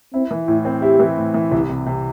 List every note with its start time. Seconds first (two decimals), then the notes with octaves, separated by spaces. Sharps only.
0.13 C4 E4
0.31 E3
0.48 A2 E4
0.65 C4
0.82 E4 G4
1.00 E3
1.17 A2
1.34 E3
1.52 C2 E4
1.69 C3
1.86 C3